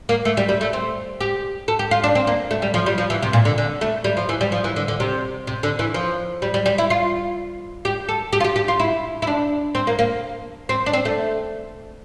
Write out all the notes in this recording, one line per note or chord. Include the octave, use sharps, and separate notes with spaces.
A#3
A3
G3
G3
A3
C4
G4
A4
G4
F4
D4
C4
A#3
A3
G3
F3
G3
F3
E3
C3
A#2
D3
D3
A3
G3
F3
E3
G3
F3
E3
D3
D3
C3
C3
D3
E3
F3
G3
G3
G3
E4
F4
G4
A4
G4
F4
G4
G4
F4
E4
E4
D4
C4
A#3
A#3
C4
D4
C4
A3